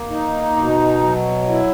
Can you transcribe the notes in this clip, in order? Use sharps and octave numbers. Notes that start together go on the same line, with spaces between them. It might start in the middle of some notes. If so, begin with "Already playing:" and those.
Already playing: A#3
D#4
B2
F#3
E4